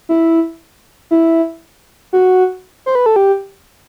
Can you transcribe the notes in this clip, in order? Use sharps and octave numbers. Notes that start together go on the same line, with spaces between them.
E4
E4
F#4
C5
B4
A4
G4